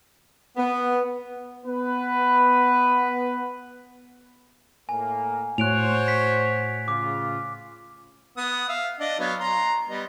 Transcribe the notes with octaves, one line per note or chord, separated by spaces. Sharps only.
B3
B3 B4
A2 A#3 G#5
A2 F#4 C5 C#5 F#6 D7 F7
B6
C#3 F4 D6
B3 F#5 D#6
E5 F5
D4 D#5
F#3 B3 F5
A#5 C6
G3 B3 D#5